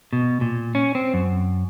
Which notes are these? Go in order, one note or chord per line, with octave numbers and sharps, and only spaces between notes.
B2
A#2
C#4
C4
F#2